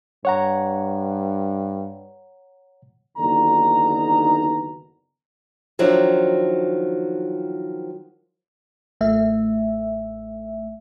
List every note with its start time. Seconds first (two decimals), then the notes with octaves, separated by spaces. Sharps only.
0.25 G2 C#5 F#5 A#5
3.18 F#1 D#2 D3 B3 D#4 A#5
5.79 D#3 F3 F#3 D4 E4
9.01 A1 A3 E5